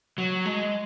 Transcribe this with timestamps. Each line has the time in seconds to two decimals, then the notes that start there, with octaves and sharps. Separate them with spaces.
0.18 F#3
0.45 G#3